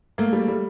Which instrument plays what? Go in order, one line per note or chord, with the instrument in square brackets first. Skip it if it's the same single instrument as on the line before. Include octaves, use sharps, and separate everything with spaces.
[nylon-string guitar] A3 [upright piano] A#3
[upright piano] G3
G3